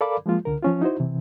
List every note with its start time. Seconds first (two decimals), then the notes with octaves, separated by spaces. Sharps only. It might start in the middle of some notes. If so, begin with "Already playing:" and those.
0.01 A4 A#4 D5 F5 B5 D6
0.26 F3 G#3 A#3 F4
0.45 C#2 D3 A#4
0.62 F3 C#4 F4
0.82 D#4 E4 F#4 C5
1.00 C3 E3